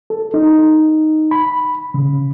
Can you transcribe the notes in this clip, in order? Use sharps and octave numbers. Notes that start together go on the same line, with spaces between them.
A4
D#4
B5
C#3